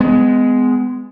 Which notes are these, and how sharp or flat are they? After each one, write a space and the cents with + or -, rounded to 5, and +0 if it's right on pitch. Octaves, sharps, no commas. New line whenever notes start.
G#3 +0 B3 +35